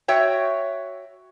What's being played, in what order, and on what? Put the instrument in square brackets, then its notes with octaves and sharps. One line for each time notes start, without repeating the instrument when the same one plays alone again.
[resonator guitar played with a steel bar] F#4 C#5 E5 G5